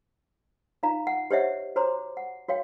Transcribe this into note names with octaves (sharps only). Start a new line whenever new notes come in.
D#4 F4 D5 F5 A#5
F#5
G4 C5 C#5 D#5 E5 F#5
F#4 C5 C#5 A#5 C6 D6
F#5
F#4 C#5 F5 G5